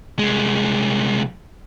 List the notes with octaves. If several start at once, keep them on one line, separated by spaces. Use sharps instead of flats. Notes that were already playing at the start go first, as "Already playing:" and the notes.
C2 G#3